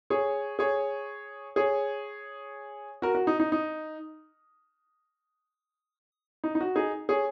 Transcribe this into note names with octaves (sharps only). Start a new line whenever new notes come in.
G#4 C#5
G#4 C#5
G#4 C#5
F#4 A#4
F#4
D#4
D#4
D#4
D#4
D#4
F#4
D#4 G#4
G#4 C#5